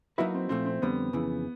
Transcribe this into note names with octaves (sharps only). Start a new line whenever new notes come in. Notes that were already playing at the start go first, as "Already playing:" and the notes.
F#3 A#3 D#4 E4 F#4 B4
C4
A#2 F3 A3 C4
C4
F2 D3 G3 B3 C4
F2 C#3 E3